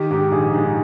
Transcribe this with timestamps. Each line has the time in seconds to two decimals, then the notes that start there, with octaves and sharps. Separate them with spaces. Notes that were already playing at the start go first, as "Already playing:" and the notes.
Already playing: D#3 G4
0.11 G#2 G4
0.32 A#1 G#4
0.54 G#2